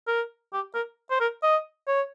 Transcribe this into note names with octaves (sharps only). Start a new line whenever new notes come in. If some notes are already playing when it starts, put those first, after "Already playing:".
A#4
G4
A#4
C5
A#4
D#5
C#5